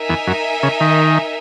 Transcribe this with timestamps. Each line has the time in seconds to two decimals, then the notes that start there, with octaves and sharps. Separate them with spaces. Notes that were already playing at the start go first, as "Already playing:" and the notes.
Already playing: D#4 A#4 E5 G#5
0.09 E2
0.27 F#2
0.63 C#3
0.81 D#3